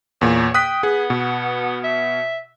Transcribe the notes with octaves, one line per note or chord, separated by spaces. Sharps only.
E2 A#2 C#5
G5 D#6 F#6 B6
B3 G#4
B2
E5